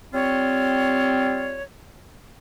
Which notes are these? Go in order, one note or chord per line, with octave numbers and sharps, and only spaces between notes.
G3 C4 F4 C#5